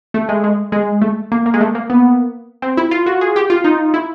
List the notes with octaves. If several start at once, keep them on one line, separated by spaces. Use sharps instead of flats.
A3
G#3
G#3
G#3
A3
A#3
A#3
G#3
A3
A#3
B3
C4
E4
F4
F#4
G#4
G4
F4
D#4
E4